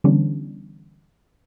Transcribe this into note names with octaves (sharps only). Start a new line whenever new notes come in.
D3 E3 G3 B3 C#4 D4